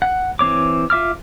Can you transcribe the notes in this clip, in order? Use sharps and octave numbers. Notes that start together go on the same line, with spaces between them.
F#5
E3 C4 C#5 D6
F4 E5 D6 F6